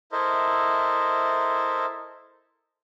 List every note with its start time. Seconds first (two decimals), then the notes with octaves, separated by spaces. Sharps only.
0.12 E4 A4 A#4 C5 D#5 E5